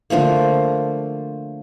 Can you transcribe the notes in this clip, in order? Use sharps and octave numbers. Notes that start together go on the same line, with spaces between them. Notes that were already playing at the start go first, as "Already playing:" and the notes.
D3 F3 A3 A#3